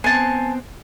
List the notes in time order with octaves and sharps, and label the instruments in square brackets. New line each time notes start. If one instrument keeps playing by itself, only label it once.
[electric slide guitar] B3 C4 C5 [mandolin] G#5 A5